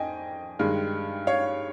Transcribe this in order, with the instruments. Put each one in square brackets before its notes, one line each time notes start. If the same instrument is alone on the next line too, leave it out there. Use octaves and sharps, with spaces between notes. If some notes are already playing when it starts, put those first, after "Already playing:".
Already playing: [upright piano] F2 D#3 D#5 G5 G#5
G2 D#3 G#3
C#5 F5